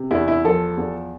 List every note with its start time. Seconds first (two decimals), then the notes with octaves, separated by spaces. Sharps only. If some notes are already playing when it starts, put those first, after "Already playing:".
Already playing: C3
0.11 E2 E4
0.28 E4
0.45 F3 A4
0.77 E2